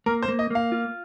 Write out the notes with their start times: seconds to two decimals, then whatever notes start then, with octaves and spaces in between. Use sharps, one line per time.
0.06 A#3 A#4
0.23 C5
0.28 A#3
0.39 D#5
0.50 A#3 F5
0.72 F4